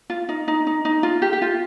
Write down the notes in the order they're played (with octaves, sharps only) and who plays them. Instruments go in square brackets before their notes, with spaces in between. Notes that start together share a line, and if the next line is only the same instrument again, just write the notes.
[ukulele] F4
D#4
D#4
D#4
D#4
F4
G4
G4
F4